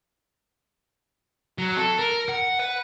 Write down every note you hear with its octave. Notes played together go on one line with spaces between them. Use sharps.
F#3
A4
A#4
F#5
B4